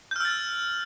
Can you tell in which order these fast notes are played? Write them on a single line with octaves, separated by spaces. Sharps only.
G6 F6 E6 A6